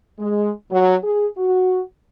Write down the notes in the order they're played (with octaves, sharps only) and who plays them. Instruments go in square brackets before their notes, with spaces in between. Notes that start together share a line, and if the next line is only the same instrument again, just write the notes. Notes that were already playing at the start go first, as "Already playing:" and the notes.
[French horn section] G#3
F#3
G#4
F#4